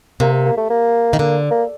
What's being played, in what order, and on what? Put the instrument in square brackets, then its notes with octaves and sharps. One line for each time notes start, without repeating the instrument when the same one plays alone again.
[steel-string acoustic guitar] C3 [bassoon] A#3
[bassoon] A#3
A#3
A3
A#3
[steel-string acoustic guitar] D#3
[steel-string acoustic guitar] D3 [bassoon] A#3
[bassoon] A#3